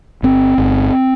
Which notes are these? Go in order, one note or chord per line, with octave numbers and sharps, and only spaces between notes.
G1 C4
G1